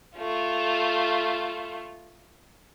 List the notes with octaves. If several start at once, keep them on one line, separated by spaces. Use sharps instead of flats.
A3 F4